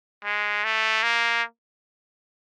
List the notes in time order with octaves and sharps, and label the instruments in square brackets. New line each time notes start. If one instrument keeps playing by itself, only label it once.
[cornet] G#3
A3
A#3